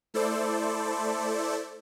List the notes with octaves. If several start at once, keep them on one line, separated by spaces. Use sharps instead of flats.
A3 E4 A4 C5 D5